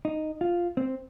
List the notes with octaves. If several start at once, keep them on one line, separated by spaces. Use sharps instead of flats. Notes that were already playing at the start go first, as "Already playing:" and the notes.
D#4
F4
C4